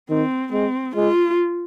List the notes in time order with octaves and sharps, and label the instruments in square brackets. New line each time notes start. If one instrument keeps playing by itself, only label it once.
[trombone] D#3 [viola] C4
[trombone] G#3 [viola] C4
[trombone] G#3 [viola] F4